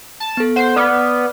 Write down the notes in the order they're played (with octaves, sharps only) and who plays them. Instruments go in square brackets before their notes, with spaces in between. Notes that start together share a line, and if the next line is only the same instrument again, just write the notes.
[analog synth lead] A5
[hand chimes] B3 A4
[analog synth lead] C5 [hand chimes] F#5
[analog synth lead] B3 [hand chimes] D5 D6 F6